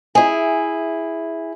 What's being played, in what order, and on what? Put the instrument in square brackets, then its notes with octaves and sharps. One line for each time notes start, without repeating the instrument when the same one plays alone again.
[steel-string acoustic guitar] E4 G#4